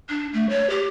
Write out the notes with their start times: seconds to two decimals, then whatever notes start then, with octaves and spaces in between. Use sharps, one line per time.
0.09 D4
0.33 A3
0.50 C#5
0.70 G4